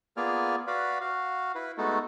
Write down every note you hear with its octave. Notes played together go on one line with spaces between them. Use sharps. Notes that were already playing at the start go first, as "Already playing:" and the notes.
A#3 B3 F4 G#4 D5 F6
F#4 B4 D5 F5 B5
F#4 F5
E4 B4
G#3 A3 B3 D#4 F#4 A4